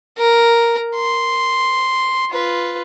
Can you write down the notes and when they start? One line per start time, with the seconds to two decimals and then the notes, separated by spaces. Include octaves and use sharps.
0.18 A#4
0.96 C6
2.31 F4 B4